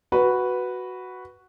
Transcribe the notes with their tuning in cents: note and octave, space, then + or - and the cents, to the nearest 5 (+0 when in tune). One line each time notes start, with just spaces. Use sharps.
F#4 +0 B4 +0